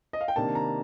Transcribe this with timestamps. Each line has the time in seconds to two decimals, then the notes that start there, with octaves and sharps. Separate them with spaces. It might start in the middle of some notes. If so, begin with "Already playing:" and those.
0.13 D#5
0.21 F5
0.28 G5
0.36 C3 D#3 A#3 D4 A5
0.55 A#5